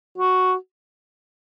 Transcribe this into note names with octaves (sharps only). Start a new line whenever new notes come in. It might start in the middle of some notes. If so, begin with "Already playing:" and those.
F#4